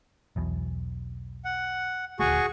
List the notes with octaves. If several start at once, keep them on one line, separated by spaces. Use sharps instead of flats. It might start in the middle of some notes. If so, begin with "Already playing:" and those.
B1 E2 B2
F#5
D#1 D2 A3 F#4 G#4 C#6